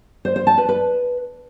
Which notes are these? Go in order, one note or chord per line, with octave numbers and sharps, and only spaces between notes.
C5
C5
A5
B4
B4